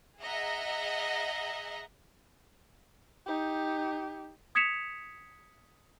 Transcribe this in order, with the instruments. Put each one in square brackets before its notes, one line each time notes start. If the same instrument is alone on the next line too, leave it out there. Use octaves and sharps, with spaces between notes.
[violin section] G#4 D#5 E5 F#5 A#5
[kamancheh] D#4 G4
[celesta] D#6 G#6 B6 C#7 E7 F7